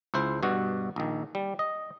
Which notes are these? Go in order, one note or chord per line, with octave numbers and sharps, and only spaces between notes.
C#2 E4 C5
G2 B2 F#4
A#1 D#3
G3
D#5